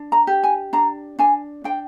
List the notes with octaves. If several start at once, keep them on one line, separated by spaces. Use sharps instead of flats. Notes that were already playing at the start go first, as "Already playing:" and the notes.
Already playing: D4
A#5
G4
G#5
D4 A#5
D4 G#5
D4 G5